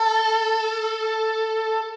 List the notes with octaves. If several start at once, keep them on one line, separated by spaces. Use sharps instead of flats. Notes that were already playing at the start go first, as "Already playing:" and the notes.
Already playing: A4